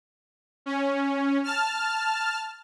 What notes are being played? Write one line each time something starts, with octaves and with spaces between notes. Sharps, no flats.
C#4
A5 F6